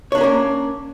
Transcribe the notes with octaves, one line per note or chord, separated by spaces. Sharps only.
A#3 C#4 D4 A#4 C#5